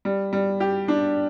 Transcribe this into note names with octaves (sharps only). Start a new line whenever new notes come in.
G3
G3
G4
D4